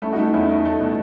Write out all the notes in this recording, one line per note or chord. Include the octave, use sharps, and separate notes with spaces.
A3 C#4 E4
D#4 F#4
A3 C#4 E4
E2 C#4 E4
D#4
A3
B2